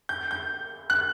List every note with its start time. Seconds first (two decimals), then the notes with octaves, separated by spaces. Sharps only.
0.09 G6
0.31 G6
0.90 F#6